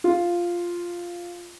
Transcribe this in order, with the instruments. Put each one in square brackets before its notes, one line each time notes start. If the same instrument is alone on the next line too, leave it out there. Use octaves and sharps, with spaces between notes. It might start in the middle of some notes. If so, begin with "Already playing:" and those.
[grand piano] F4